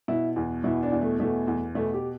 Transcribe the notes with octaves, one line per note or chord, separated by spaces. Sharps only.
B2 E4
E2
B2 E4
D4
E2
A3
B2 A3
E2
B2 A3
G4